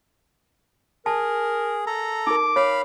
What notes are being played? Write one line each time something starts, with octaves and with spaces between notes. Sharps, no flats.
G#4 A#4 A5
A4 A#5
D#4 A#4 D6
C#5 F5 B5